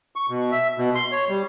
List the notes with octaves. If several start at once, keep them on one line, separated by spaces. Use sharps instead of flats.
C#6
B2
E5
B2
C6
C#5
G3